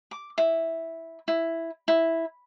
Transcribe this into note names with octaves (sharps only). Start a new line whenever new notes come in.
D6
E4
E4
E4